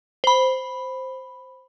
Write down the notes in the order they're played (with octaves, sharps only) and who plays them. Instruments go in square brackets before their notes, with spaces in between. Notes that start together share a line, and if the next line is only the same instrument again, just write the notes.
[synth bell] C5 B5